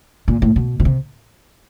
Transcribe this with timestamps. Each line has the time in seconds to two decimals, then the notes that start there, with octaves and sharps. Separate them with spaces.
0.28 A#2
0.42 A2
0.56 B2
0.80 B2
0.85 C3